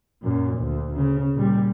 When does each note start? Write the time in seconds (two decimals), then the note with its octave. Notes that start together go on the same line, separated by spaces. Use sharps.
0.23 F#2 A#2
0.58 D2
0.96 C#3
1.35 A#2 G3